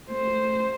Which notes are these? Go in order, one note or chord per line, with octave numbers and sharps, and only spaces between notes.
A3 C5